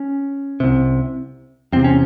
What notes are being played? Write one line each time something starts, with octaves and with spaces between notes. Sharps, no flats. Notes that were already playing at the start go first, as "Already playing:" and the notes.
Already playing: C#4
C2 C3
E2 C3 C4
C#4